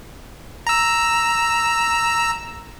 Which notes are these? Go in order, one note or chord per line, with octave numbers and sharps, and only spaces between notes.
A#5 E6